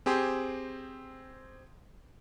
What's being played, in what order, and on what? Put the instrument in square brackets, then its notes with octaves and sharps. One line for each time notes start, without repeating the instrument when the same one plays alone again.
[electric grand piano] C4 G4 G#4 C5